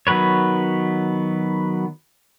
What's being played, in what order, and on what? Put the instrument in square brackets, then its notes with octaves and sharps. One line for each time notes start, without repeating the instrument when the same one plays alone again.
[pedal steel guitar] D#3 F#3 B3 B4 C#5